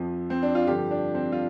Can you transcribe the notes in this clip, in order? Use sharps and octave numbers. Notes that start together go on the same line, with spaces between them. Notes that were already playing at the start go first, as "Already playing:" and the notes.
Already playing: F2 F3
C4
D4
F4
G2 D3 F3 G4
D4
C4
F4